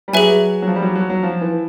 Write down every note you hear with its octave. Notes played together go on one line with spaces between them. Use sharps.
G3
F#3 G#4 B4 E5 G#5
F#3
F3
G3
F#3
F#3
F#3
F3
E3